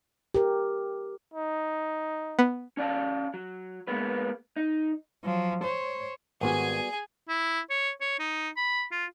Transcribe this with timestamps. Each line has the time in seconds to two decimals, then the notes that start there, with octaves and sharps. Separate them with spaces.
0.34 G4 A#4
1.34 D#4
2.39 B3
2.77 C#4 D5 F5 A5
3.34 F#3
3.87 G#3 A#3 B3 B4
4.56 D#4
5.24 F3 F#3
5.64 C5 C#5
6.41 G#1 G3 B3 F#4 G#4 G#5
7.28 E4
7.70 C#5
8.01 C#5
8.19 D#4
8.56 B5
8.92 F4